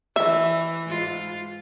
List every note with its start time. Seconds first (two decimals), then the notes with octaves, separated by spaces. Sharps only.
0.16 E3 E5
0.88 G#2 F4